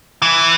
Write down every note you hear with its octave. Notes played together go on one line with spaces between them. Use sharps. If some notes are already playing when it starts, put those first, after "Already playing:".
E3